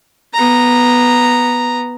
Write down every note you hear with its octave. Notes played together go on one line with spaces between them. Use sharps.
B3 A#5